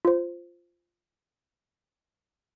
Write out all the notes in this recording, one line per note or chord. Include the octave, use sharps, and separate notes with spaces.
F4 C5